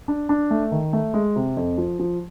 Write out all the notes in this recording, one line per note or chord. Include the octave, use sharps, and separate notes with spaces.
D4
D4
A3
D#3
A3
G#3
C3
F2
F3
F3